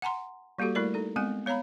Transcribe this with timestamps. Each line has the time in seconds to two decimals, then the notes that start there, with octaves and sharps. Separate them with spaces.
0.02 F#5 G#5 A#5 C6
0.59 G3 A#3 F#4 G4 A4
0.75 G3 A3 E4 A#4 D5
0.94 D#4 A4
1.16 G#3 B3 C4 G#5
1.46 B3 C#5 F5 A#5 B5